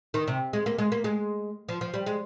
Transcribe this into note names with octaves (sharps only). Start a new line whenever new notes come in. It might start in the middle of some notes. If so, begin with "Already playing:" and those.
D#3
C3
G#3
A#3
G#3
A#3
G#3
F3
F3
G3
G#3